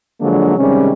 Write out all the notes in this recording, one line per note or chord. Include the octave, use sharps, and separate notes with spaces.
D3 F3 F#3 G#3 A#3 D4
C3 D#3 G3 G#3 C#4